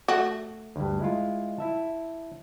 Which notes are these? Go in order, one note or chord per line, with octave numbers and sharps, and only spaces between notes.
A3 F#4
D2 G2
G#3 E4 F4
E4 E5 A5